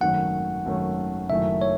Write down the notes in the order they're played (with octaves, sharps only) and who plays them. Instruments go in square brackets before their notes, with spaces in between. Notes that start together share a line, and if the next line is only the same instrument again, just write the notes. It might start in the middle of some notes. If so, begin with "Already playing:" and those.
[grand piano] G#1 F#2 D#3 A3 C#4 [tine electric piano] F#5
[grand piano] G#1 F#2 D#3 A3 C#4
[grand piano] F#1 F#2 D#3 A3 E4 [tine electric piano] E5
[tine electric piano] C#5